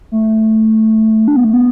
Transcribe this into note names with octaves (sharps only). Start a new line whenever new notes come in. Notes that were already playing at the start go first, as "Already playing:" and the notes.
A3
D4
B3
A3
B3